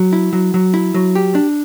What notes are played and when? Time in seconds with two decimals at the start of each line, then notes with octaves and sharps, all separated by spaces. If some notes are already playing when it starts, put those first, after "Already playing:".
Already playing: F#3
0.13 E4
0.33 F#3
0.54 F#3
0.74 E4
0.94 F#3
1.15 G4
1.35 D4